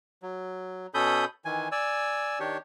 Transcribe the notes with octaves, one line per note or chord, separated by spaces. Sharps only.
F#3
B2 C#4 A4 B5 D#6 G6
D#3 E3 G#5
D5 G#5 E6
D#3 D4 G4 C#5